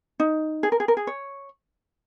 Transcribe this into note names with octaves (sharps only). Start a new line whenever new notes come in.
D#4
G#4
A#4
G#4
A#4
G#4
C#5